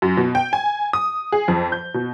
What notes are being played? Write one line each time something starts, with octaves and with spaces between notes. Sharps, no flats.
F#2
B2
G5
G#5
D#6
G#4
F2
G6
B2